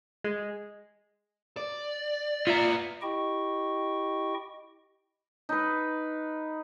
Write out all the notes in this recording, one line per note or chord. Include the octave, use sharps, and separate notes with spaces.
G#3
D5
A#3 B3 F4 E5 A#5
E4 G4 D#5 G5 C#6
D#4 B4